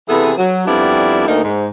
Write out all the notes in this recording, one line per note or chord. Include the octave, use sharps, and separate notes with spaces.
C3 E3 B3 G#4 A4
F#3
F2 G3 B3 D4 E4 D5
D2 A#3 D#4
G#2